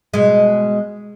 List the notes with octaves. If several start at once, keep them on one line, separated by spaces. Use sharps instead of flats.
B2 G#3